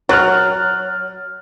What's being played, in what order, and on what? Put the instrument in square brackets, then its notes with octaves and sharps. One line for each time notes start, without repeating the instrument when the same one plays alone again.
[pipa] F#3 [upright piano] F6 F#6 A6